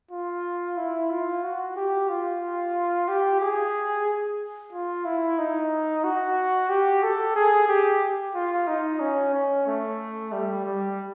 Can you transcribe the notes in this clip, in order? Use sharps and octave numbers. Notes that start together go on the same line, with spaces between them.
F4
E4
F4
F#4
G4
F4
G4
G#4
F4
E4
D#4
F#4
G4
A4
G#4
G4
F4
D#4
C#4
C#4
A3
G3
G3